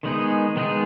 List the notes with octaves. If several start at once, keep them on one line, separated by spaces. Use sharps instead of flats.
D#3 G#3 B3 D#4 G#4
D#3 G#3 B3 D#4 G#4